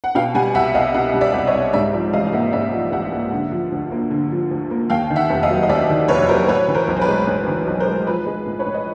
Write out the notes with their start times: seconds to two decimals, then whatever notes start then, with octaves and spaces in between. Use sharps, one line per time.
0.04 F#5
0.15 B2 F5 G5
0.34 G3 F#5 G#5
0.55 C2 E5 F#5
0.75 C2 D#5 F5
0.94 B2 E5 F#5
1.14 G3
1.21 D5 E5
1.34 C2
1.47 C#5 D#5
1.54 C2
1.73 G#2 D5 E5
1.93 F3 D5 E5
2.13 A1 D#5 F5
2.27 F5
2.33 A#3 E5 F#5
2.52 G#2 D5 E5
2.73 F3
2.92 A1 E5 F#5
3.12 A#3
3.32 D3
3.51 F3
3.72 D2
3.91 A#3
4.11 D3
4.31 F3
4.51 D2
4.71 A#3
4.90 D#2 F5 G5
5.10 D#3
5.16 E5 F#5
5.29 F1
5.43 D#5 F5
5.49 F#3
5.63 D#5
5.69 D#2 D5 E5
5.89 D#3
6.08 F1 B4 C#5
6.28 F#3 A#4 C5
6.48 A2 B4 C#5
6.68 E3
6.75 A#4 C5
6.88 B1
6.97 C5
7.01 B4
7.08 G#3
7.27 A2 B4
7.47 E3
7.67 B1
7.80 A#4 C5
7.86 G#3
8.06 F3 B4
8.26 G#3
8.46 A2
8.59 B4 C#5
8.66 A2
8.74 D#5